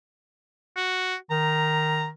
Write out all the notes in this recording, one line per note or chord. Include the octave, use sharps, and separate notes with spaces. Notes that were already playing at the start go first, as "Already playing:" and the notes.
F#4
D#3 A#5